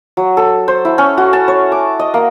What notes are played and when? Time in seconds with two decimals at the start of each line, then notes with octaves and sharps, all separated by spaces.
0.17 F#3
0.37 A4
0.68 C5
0.85 E4
0.98 C#4
1.18 F#4
1.33 A5
1.48 C#5
1.72 D6
1.99 D#5
2.14 A#3